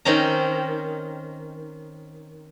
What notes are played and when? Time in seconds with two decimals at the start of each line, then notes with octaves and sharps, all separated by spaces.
0.05 D#3 C4 C#4 A#5